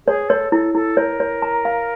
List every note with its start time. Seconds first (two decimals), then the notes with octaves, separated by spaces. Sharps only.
0.06 G#4 C#5
0.29 A4 C#5
0.52 E4 A4
0.75 E4 A4
0.97 A#4 C#5
1.20 C#5
1.42 A#5
1.65 F5